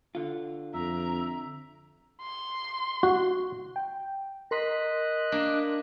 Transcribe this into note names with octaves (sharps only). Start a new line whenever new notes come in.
D3 F4
F2 E5 A#5
C6
F#4
G5
A#4 D#5 C6 F#6 B6
A#3 D4